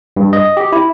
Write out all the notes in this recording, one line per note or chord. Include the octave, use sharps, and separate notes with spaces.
G2
D#5
G4
E4